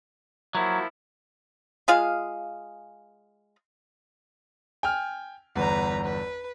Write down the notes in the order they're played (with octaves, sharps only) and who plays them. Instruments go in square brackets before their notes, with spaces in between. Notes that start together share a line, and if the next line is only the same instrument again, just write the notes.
[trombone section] F3 A#3 E4 [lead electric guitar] F#3
[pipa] G#3 F4 G#4 F5
[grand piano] G5 G#5 F6
[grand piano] G1 E2 [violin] B4 A#5
[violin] B4